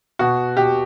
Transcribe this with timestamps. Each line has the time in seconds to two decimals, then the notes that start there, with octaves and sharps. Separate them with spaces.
0.19 B2 F#4
0.57 B2 G4